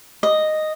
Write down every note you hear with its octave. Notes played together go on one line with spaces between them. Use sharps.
D#5